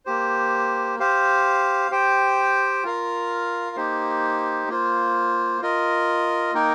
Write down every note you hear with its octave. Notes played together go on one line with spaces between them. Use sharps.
A#3 G4 C5
G4 C5 F5
G4 C5 G5
F4 A#4 F5
A#3 D#4 G4 C5
A#3 F4 C5
F4 A#4 D#5
A#3 D#4 A#4 G5